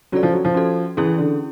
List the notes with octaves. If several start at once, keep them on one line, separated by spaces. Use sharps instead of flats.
F#3 C#4 F4 A4 D5
F3
F#3
F3
C#4 F#4 A4
E3 C#4 E4 G#4
D3